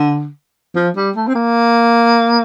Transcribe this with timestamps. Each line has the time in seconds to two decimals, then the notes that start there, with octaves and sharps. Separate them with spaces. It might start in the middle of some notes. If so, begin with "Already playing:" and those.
Already playing: D3
0.75 F3
0.96 G3
1.16 A3
1.27 C4
1.35 A#3